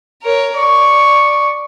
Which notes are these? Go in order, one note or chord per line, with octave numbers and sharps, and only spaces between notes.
A#4 C#5
D5 C#6